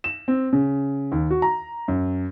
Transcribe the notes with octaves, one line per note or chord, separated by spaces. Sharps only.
E7
C4
C#3
D#2
F#4
A#5
F#2